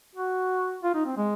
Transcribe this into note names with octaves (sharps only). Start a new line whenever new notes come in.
F#4
F4
D#4
C4
G#3